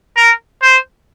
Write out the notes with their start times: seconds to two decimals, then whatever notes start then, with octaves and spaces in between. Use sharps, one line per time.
0.17 A#4
0.62 C5